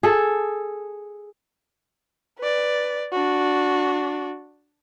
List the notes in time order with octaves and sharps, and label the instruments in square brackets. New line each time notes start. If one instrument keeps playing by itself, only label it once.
[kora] G#4 A4
[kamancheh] B4 D5
D4 F#4